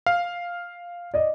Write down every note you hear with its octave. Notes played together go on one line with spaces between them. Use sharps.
F5
D5 D#5